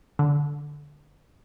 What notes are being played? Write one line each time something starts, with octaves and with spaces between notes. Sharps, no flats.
D3